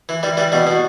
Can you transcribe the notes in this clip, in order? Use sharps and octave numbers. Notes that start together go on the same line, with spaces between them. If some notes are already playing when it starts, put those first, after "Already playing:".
E3
E3 G3
E3 G3
B2 G3
B2